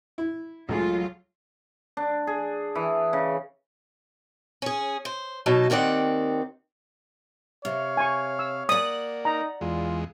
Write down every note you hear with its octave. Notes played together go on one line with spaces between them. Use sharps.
E4
C#2 F#3 A3 F4 G#4
D4
G#4
E3
C#3
C#4 G#4
C5
B2 F#3 D#4 A5
D#2 D#3 C4 D5 F#5
C3 C#5 F5
G#5 C#6
E6
A#3 D5 F#5 D#6
D#4 A#5
E2 G#3 F4